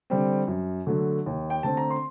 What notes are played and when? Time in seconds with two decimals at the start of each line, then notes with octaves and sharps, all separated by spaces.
0.10 D3 G3 C4
0.47 F#2
0.87 D3 F#3 A3
1.26 D#2
1.50 G5
1.63 D3 A3 C4 A5
1.77 A#5
1.90 C6